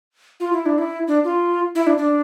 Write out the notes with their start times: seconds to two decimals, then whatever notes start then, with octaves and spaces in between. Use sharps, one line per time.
0.40 F4
0.53 E4
0.66 D4
0.78 E4
1.08 D4
1.24 F4
1.75 E4
1.87 D4
1.98 D4